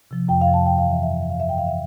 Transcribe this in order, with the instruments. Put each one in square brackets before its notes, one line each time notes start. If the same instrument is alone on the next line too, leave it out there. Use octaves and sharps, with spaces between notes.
[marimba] C3 F3
F2 G5
F5
C3 F3
A5
G2 G5
F5
E3
E5
G2 E5
E3 E5
F5
G2 E5
G5
E3 F5
E5